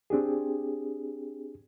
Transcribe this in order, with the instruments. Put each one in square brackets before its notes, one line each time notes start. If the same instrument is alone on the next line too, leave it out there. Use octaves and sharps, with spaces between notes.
[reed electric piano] C4 D4 G4 G#4